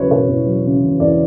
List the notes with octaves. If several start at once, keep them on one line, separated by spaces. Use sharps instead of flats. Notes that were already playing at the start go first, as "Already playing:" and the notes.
Already playing: E2 C#3 F#3 B4 C#5
E1 C#5
E2
F#3
C#3
E1
E2 D5